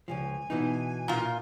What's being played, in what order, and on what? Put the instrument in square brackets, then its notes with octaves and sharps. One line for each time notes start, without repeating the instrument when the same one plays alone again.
[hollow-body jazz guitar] C#2 G2 F3 [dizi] G#5
[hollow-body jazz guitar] B2 E3 D#4
[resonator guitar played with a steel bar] A#2 F4